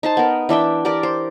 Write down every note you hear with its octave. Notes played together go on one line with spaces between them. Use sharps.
D#4 C5 A5
B3 A#4
E3 D4 E5 G5
G4 A#4 D5
C5